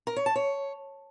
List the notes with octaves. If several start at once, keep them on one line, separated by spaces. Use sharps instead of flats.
A#4
C#5
A5
C#5